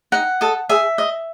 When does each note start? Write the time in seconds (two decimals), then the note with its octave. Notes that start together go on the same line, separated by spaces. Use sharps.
0.12 D#4 F#5
0.41 A4 D#5
0.69 G#4 E5
0.98 D#5